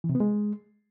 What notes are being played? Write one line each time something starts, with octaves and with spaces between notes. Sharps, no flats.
E3
C3
B3
G#3